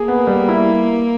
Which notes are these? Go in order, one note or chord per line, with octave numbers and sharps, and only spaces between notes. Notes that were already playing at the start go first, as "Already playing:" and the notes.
Already playing: A#3 G#4
B3
G3
E4